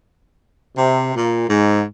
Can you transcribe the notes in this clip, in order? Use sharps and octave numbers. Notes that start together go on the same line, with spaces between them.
C3
A#2
G#2